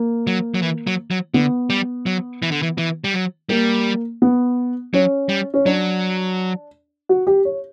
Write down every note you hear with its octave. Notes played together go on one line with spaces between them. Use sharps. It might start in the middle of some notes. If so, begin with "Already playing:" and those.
Already playing: A#3
F#3
F#3
E3
F#3
F#3
D3 B3
G3
F#3
E3
D3
E3
E3
G3
F#3
G3 A#3
B3
F#3 C#4
G3
C#4
F#3 D4
F#4
G4
C#5